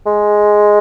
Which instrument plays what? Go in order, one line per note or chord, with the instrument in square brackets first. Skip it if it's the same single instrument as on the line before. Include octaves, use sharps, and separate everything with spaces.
[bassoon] G#3